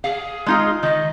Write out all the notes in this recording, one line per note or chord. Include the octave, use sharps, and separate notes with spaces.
G#4 F5
G#3 D#4 F4
D#3 D#5